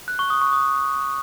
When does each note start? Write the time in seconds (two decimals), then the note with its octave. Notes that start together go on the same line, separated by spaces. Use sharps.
0.08 F#6
0.19 C#6
0.30 D#6
0.41 C#6
0.53 D#6